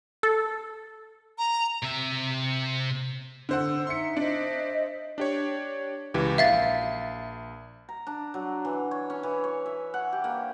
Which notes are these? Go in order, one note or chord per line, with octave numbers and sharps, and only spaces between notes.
A4
A#5
C3 E5
D3 C5 F#5 E6
D#4 E5 C6 C#7
D4 C5 D#5 E5
D4 G4 C#5
C#2 E3 G4
A#1 E5 F5 A6
A#5
D4
F#3
E3
C#5
C#4
E3
C#5
E5
F#5
G4
A#3